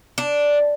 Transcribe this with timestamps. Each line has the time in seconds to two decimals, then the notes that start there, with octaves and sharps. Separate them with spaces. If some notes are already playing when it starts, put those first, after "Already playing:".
0.18 D4